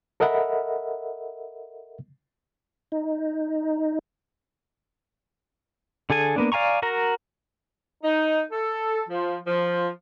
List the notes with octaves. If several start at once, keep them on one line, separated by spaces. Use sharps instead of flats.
A4 A#4 D#5 E5 F#5 B5
D#4
D3 G#4 A4 G#5
A#3 B3 D4
D5 F5 G#5 A#5 C#6
F#4 A#4 A#5
D#4
A4
F3
F3